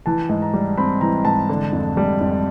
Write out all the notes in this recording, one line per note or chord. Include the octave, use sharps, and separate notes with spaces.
E3 A5
G#2
A#5
G3
C4 B5
E3 A#5
G#2 A5
D3
F2
G3
F2